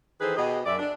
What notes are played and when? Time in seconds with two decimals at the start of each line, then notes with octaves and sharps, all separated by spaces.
0.21 D#3 E3 G#4 A4 B4 C5
0.37 B2 G4 G#4 D#5
0.66 F#2 D5 E5
0.79 D4